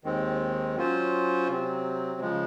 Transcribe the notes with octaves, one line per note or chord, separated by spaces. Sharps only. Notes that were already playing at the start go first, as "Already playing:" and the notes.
D#2 D#3 G#3 C4
F#3 C#4 F4 C5
C3 F#3 C4
C#3 F3 G#3